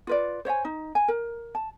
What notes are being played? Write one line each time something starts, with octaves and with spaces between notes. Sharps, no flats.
F4 B4 D5
C5 C#5 E5 G#5
D#4
G#5
A#4
A5